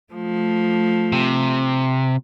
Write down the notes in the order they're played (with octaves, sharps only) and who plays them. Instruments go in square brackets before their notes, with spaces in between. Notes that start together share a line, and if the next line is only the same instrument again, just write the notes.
[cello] F3 A3
[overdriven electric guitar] C3